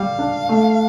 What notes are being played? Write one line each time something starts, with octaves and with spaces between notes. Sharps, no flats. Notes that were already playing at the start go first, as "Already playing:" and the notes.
Already playing: G3 F5
D4
A3